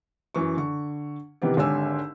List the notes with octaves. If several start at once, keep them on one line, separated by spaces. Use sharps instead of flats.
F#2 E3 C#6
D3 C#6
C3 D#3 E3 B3 G4
G#1 D3 G4 C#5 G#5 E6